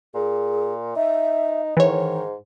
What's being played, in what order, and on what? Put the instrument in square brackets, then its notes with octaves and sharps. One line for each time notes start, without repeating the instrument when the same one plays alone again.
[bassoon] A#2 [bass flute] G#4
[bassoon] D#4 [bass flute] E5
[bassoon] G#2 [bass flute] D#3 [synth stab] E3 C#5